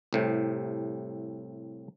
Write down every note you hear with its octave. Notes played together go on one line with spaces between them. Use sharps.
C2 A2 C3